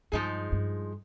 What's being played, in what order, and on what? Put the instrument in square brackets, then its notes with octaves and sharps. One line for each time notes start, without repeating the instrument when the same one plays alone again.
[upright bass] G2 [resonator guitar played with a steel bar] F3 G#3 D#4 G#4
[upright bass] G2